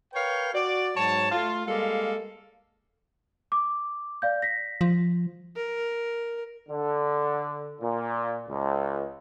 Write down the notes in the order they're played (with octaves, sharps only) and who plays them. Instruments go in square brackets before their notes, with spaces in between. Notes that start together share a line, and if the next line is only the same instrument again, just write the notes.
[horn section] A#4 B4 C#5 F5 G5
F#4 D5
G#2 F#3 C#5 A5
A3 F4
G3 G#3 A#3 A4 F5
[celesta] D6
D5 F5 G6
A#6 B6
[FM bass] F3
[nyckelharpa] A#4
[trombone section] D3
A#2
C#2